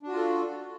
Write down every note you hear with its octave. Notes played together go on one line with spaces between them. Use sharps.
D4 F4 F#4 A4